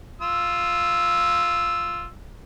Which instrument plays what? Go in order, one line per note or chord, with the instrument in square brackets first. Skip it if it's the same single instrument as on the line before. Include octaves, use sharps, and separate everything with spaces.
[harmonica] F4 E6